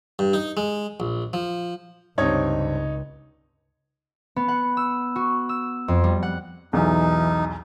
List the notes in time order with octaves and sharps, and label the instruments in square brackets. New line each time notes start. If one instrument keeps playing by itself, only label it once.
[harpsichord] G2
D#4
G#3
A#1
F3
[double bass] C#2 [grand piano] G2 C3 C4 [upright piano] D#4 C#5 G#6
[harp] B3
F#5
E6
F#4
E6
F2
G3
F#5
[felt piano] B1 E2 [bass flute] E3 [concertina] D#4